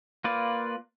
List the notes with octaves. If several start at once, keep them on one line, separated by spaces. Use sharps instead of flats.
A#3 F4 B4 D5